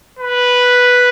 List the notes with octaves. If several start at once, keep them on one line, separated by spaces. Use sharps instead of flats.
B4